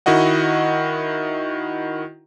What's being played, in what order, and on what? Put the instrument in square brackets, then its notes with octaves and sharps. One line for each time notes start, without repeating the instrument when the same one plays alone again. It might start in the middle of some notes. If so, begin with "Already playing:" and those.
[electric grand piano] D#3 E4 F#4 D#5 F#5